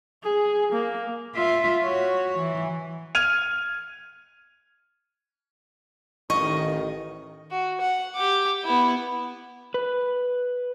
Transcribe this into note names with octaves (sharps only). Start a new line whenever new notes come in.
G#4
A#3
F4 E5
F#4 C#5
E3
F6 G#6 D#7 F7
A1 D#3 D#5 C#6
F#4
F#5
G4 D6
B3 E4
B4